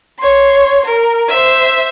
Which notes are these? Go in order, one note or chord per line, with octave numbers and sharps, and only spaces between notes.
C#5 C6
A#4
C5 E5